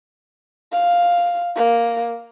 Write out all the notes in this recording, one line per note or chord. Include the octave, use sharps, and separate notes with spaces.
F5
A#3